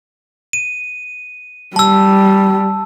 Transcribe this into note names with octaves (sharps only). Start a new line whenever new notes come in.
D#7
G3 A5 E6